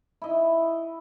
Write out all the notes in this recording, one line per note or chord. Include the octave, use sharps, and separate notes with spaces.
E4 D#5